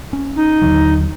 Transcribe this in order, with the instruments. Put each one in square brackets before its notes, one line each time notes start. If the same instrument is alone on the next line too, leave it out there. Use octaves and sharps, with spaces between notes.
[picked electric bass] C#4
[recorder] D#4
[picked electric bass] D#2 D3 F#3